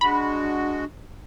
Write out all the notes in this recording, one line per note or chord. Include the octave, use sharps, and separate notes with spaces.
G#3 D4 F#4 B5